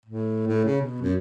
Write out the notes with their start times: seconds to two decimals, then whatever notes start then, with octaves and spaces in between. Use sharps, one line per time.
0.06 A2
0.47 A2
0.65 C#3
0.82 B2
1.01 F#2